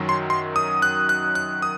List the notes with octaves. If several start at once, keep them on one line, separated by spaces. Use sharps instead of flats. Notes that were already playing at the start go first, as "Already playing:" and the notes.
Already playing: F#2 D#3 F#3
C6
C6
D#6
F#6
F#6
F#6
D#6